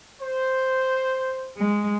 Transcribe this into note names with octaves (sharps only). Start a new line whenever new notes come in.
C5
G#3